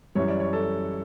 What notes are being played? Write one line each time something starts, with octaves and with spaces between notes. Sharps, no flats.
F#2 E3 G3 C#5
D5
C#5
A4